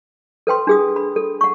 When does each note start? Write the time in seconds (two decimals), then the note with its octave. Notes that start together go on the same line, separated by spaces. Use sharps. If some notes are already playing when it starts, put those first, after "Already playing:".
0.47 A4 B4 G5 C6
0.67 D4 G#4 D#6
0.96 B5
1.16 A4
1.41 F#5 C#6